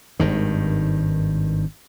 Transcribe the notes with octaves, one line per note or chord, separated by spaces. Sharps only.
G#1 G2 D#3